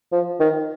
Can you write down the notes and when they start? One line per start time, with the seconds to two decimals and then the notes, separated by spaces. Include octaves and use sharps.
0.12 F3
0.40 D#3